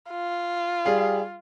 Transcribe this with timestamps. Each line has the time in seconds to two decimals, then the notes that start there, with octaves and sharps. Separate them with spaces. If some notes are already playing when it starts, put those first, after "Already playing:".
0.11 F4
0.85 G3 G#4 F5